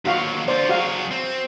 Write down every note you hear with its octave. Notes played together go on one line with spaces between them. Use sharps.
D#2 F#3 F4 F#4 F5
D3 F4 C5 D5
F#3 F#4 G#4 F5
C4